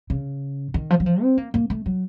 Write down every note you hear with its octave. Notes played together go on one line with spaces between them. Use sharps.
C#3
D#3
F3
F#3
F3
C4
A#3
A#3
A3
F#3